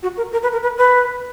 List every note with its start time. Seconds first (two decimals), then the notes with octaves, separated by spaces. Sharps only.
0.03 F#4
0.17 A#4
0.32 A#4
0.43 B4
0.52 A#4
0.63 B4
0.78 B4